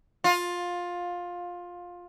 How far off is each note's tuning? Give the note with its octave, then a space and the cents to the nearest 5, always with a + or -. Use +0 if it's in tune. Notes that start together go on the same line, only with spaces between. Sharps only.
F4 +15